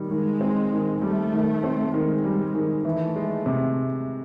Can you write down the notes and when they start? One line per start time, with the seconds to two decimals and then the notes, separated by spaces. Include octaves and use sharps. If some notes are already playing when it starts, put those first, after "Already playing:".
Already playing: D#3 G3
0.11 D#3 G#3
0.41 C4
0.72 D#3
1.02 G3 A3
1.33 D#3
1.64 C4
1.93 D#3 G#3
2.24 G3
2.54 D#3
2.85 E3 A3
3.16 G#3
3.46 C3